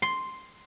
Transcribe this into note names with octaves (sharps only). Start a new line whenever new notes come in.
C6